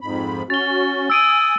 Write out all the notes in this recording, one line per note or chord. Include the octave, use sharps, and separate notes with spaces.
F2 G#2 B5
C#4 F#4 A6 G7
G#5 D#6 E6 D7 D#7